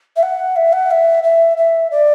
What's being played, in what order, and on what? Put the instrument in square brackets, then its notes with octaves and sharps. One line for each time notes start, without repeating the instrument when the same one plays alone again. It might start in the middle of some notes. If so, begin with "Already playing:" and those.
[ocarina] E5
F#5
E5
F#5
E5
E5
E5
D5